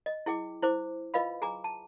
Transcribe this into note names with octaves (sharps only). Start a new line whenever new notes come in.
D#5
E4 G#4 G5 D6
E4 C5 D6
F4 B4 D#5 F5 B5
G#4 G#5 A#5 D6
A5